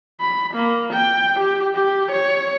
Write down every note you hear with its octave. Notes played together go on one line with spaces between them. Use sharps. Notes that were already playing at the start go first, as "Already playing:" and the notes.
B5
A#3
G5
G4
G4
C#5